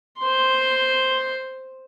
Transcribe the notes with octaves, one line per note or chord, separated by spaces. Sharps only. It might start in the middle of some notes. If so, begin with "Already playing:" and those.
C5 C6